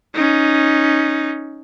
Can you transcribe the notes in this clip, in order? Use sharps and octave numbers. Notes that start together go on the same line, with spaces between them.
C#4 D#4